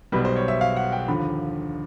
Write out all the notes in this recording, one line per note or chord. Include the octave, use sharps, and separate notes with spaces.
B1 B2 G3 B4
C5
C#5
E5
F5
F#5
G5
D#2 D3 F3 B5